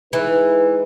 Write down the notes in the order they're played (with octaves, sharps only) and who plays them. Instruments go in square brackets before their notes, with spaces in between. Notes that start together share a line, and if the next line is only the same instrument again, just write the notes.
[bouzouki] E3 [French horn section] G#3 D#4 G#4 B4